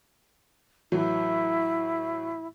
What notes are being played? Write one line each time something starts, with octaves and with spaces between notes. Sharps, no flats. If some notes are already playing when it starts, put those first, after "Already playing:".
A2 E3 F#3 E4